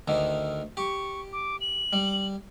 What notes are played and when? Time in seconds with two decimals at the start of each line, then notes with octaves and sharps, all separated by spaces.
0.08 D2 D3 D#3
0.77 G4 C#6
1.33 D6
1.61 F#7
1.93 G3